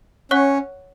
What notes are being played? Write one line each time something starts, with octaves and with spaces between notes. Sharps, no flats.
C#4 C#5 F#5 C#6 F#6